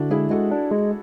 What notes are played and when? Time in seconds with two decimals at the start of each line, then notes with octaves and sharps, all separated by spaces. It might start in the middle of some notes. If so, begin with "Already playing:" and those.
Already playing: D3 D4 E4 F#4
0.10 G#3 E4 G#4
0.30 G#3 F#4 A4
0.51 D4
0.71 G#3